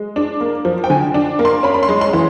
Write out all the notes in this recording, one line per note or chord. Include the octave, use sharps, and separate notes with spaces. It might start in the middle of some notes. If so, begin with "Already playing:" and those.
Already playing: G#3
D4
A#3
F3
G5
D3 G#5
D4
A#3
C6
C#4 B5
B5
C6
G#3
C6
E3